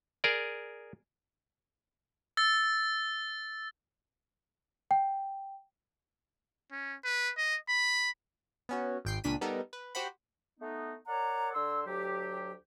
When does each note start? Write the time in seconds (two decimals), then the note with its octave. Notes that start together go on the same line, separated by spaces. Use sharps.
0.24 G#4 A#4 D5
2.37 E6 A6
4.91 G5
6.71 C#4
7.04 B4
7.37 D#5
7.69 B5
8.69 B3 C#4 F#4
9.05 G#1 G5 C7
9.24 C#2 A#2 D4 B6 D#7
9.41 G3 B3 D#4 A4 A#4
9.73 B4
9.95 F#4 G4 C5 F#5 B5
10.60 A3 B3 D#4
11.07 A#4 C#5 D5 F#5 A#5
11.54 D3 C6 E6
11.86 D2 F#3 G4